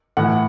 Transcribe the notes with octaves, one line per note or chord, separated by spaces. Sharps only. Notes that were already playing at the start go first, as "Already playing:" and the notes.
A2 E3 F#5